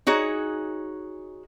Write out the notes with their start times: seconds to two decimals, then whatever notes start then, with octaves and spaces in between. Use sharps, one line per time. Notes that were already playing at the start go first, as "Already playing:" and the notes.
0.07 D#4 F#4 G#4 C#5